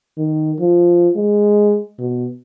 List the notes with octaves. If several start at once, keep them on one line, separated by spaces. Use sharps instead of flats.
D#3
F3
G#3
B2